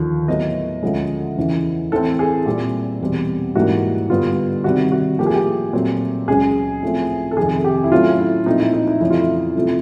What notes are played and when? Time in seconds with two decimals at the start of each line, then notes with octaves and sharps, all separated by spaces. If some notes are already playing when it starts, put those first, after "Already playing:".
Already playing: D#2 D3 F3
0.28 A2 F#3 B3 D#5
0.83 D2 D3 F3 G#3 C#4
1.37 E2 C#3 E3
1.92 A2 E3 A3 C4 A4
2.19 G#4
2.46 A#2 G3 C4 G4
3.01 E2 B2 G3 C4
3.55 G#2 E3 G3 A#3 F#4
4.10 G2 D3 G3 B3 F4
4.64 C3 D#3 G3 C4 F#4
4.92 F#4
5.19 A2 F3 A#3 G4
5.26 G#4
5.34 G4
5.73 A#2 F#3 A3 C4
6.28 C#2 C#3 F#3 G#4
6.83 A2 F3 A3 C4
7.31 A4
7.37 F2 C3 D#3 G#4
7.64 G4
7.84 E4
7.92 A2 F#3 A3 C#4 F4
8.19 E4
8.46 A#2 F3 A3 C4 D#4
8.60 E4
8.74 D#4
8.87 D#4
9.01 F2 C#3 E3 A3 C#4 E4
9.10 F4
9.21 E4
9.56 F2 C3 F3 A3